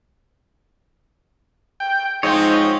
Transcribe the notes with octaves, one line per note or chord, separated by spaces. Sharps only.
G5
G#2 F3 C4 C#5 D#5 G5